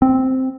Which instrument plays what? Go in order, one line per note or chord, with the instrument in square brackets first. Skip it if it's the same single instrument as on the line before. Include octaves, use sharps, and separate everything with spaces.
[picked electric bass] C4